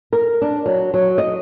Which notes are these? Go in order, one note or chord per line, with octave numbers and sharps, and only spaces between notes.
A#4
D4
F#3
F#3
D#5